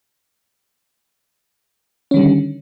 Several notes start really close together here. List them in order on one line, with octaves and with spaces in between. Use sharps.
C#4 D#3 G3 D3